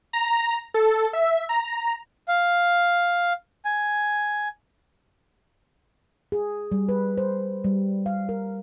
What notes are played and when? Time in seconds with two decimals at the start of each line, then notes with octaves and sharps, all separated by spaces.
0.13 A#5
0.74 A4
1.13 E5
1.49 A#5
2.28 F5
3.65 G#5
6.32 G#4
6.72 G3
6.89 B4
7.18 C5
7.64 G3
8.06 F5
8.29 A#4